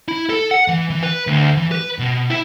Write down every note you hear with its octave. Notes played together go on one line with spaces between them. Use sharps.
E4
A4
F#5
E3
E3
B4
D2
E3
B4
B2
E4